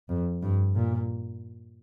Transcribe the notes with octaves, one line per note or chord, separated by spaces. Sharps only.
F2
G2
A#2